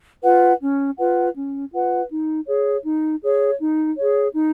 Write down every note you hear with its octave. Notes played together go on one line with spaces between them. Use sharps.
F4 B4 F#5
C#4
F4 B4 F#5
C#4
F4 B4 F#5
D#4
G#4 C#5
D#4
G#4 C#5
D#4
G#4 C#5
D#4